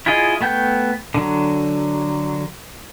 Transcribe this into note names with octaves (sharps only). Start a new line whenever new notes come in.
E4 F4 G#4 D#5
A3 B3 G5 G6
D3 F#3